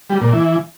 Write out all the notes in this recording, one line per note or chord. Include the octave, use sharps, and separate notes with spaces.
G3
A#2
E3